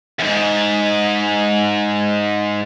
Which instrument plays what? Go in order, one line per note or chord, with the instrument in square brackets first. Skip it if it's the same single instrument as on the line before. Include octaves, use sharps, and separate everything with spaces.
[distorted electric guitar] E2 G#2